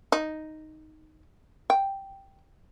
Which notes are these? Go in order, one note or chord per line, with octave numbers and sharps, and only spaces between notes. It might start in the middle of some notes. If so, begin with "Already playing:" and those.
D#4
G5